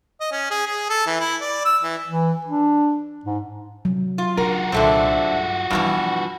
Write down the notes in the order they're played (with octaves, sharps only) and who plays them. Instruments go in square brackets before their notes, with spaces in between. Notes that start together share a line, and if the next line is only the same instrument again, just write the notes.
[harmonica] D#5
C#4
G#4
G#4
A4
E3
E4
D5
E6
E3
[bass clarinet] E3
D4
G#2
[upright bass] C3 [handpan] F#3
[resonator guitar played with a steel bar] F4
[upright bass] C#3 D4 [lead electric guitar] F4 F#4 [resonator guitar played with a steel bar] A#4
[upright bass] C2 A#2 [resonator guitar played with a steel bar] D3 A3 C4
[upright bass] G2
[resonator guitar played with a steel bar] G2 B2 E3 [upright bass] F3 G3